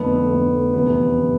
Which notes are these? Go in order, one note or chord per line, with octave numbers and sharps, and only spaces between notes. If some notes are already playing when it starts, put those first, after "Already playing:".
Already playing: F1 F2 D3 A3 B3
F1 F2 D3 A3
F1 E2 C3 B3
C3